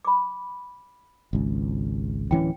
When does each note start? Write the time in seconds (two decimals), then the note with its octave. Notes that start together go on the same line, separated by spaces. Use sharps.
0.05 B5 D6
1.33 G#1 C#2
2.31 D1 E3 C#4 G5